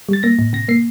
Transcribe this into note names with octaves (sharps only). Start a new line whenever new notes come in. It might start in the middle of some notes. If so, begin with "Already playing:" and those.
G3 A6
A#3 A#6
A2
C3 A#6
A#3 C7